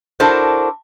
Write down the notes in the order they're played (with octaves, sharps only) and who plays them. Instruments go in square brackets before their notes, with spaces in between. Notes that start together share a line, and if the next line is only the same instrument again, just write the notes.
[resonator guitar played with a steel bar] D4 E4 F#4 A4 A#4 C5